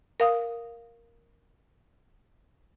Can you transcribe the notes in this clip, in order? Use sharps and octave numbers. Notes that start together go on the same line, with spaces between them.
A#4 F5 D#6